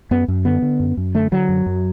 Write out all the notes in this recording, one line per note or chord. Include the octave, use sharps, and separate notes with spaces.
F#2 B3
F#2
D3 B3
D3
F#2
F#2
D3 A3
D3 F#3
F#2
F#2